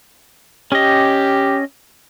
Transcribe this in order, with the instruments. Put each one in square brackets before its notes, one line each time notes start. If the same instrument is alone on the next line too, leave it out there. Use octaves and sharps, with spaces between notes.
[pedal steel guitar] C#4 D#5 [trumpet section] G4